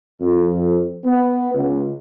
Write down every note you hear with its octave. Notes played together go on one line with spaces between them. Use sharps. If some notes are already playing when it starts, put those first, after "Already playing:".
F2
B3
C#2